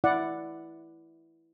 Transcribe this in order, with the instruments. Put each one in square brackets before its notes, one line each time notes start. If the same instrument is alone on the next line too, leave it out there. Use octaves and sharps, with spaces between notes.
[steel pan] E4 D5 F#5